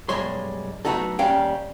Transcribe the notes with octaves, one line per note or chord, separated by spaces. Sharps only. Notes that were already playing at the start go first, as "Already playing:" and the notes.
B1 F#2 G3 G#3 C#5 C6
F#3 A3 B3 D#4 F#4 A4
D#2 D#3 G3 C#4 F5 G5